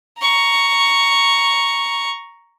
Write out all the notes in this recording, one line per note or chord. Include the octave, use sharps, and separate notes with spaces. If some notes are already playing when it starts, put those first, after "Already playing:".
A#5 C#6